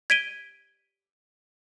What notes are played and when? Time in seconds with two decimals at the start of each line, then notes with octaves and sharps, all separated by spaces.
0.10 G#6 B6 D7 D#7 G7